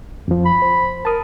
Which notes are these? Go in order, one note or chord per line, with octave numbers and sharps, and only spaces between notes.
F2 F3
B5
C5
A#4 A5 D#6